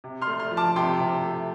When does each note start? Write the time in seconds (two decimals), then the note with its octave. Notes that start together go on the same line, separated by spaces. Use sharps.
0.04 C3
0.22 C6 F6
0.27 A3
0.40 C6 F6
0.51 F3
0.57 A5 D6
0.76 C3 G5 C6
1.00 C3
1.24 A3